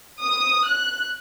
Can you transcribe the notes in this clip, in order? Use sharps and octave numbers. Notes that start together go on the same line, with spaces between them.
D#6
F#6